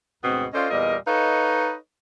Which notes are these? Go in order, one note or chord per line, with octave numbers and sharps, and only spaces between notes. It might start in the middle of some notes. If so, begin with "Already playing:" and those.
D2 G#2 B2 B3 C4
C#4 F4 A4 C5 D5 D#5
E2 A#2 G3 A#4 D#5
D#4 A4 B4 C#5 D#5 F5